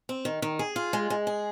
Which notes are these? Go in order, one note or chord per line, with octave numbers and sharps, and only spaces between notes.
C4
D#3
D#3
G#4
F4
G#3
G#3
G#4